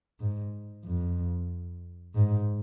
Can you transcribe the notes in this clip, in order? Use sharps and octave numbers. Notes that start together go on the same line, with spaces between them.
G#2
F2
G#2